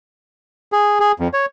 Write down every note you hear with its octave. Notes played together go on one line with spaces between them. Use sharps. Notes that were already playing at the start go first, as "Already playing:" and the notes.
G#4
G#4
F2
C#5